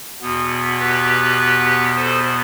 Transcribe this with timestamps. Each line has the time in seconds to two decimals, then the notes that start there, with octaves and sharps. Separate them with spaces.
0.22 E2 B2 B3
0.79 G4 B4
1.96 A4 C5